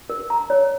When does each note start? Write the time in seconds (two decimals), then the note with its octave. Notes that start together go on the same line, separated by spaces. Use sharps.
0.10 A#4
0.30 A#5
0.50 C#5